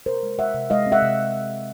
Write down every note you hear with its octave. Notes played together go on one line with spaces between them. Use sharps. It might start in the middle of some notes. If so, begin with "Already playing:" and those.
C3 A#4 C5
G#3
G#3 E5 F#5
C3
G#3 D#5 F5
C4
E5 F#5
C3